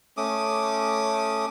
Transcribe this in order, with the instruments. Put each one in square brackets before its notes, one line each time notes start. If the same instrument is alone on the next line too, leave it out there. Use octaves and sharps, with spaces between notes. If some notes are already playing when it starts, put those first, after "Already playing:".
[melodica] A3 C#4 D6 D#6